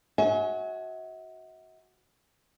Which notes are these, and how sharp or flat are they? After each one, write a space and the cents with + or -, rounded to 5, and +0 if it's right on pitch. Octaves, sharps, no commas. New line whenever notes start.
F#4 +0 E5 -45 G#5 +15